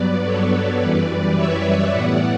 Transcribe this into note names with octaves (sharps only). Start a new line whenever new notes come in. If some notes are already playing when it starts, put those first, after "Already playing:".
Already playing: G2 F#3 B3 B4 D5
A4 C#5
F#2 E3 G3 B4 D5
C#5 E5
A2 E3 G3 B3 D5 F#5